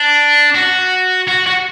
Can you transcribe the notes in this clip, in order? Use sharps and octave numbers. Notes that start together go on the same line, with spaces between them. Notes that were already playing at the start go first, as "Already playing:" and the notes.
Already playing: D4
F#4
F#4
F#4